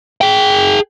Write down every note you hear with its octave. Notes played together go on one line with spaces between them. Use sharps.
G#4 G5